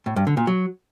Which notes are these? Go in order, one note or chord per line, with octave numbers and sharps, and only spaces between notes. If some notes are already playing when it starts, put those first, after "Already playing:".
A2
G2
D3
A#2
F#3